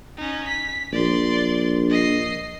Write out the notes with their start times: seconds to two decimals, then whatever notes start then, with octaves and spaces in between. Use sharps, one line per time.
0.17 C#4 D#4
0.48 B6
0.93 A#1 D5 C6
1.90 D#5 C7